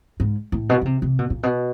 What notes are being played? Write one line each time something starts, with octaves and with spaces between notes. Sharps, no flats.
G#2
A2
B2
C#3
C3
C3
B2
A#2
B2